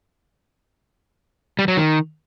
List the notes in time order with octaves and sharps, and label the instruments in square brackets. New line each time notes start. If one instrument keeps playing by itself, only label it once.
[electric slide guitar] G3
F#3
D#3